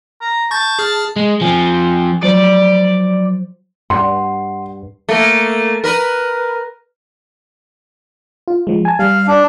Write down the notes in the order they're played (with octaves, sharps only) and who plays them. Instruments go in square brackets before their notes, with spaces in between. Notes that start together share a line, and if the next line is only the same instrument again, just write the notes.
[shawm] A#5
[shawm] A5 [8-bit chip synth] C#6 G6 A6
[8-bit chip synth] G#4 F6
[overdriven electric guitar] G#3
[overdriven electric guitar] F3 C4 [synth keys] G#5
[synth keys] F3 F#3 C5 [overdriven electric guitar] D5
[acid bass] G2 [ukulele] F#5 [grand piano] C6
[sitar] A3 A#3
A#4 B4
[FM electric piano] F4
F3 G#3
G#5 A5
[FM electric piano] G3 [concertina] F5
[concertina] D4